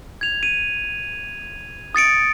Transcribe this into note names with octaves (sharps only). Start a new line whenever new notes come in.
G#6 F7
D#7
D#6 A6 C#7 D7